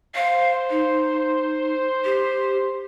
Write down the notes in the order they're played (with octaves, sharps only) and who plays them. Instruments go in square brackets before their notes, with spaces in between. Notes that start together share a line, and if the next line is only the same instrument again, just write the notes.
[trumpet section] C5 [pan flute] F5
[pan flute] D#4
G4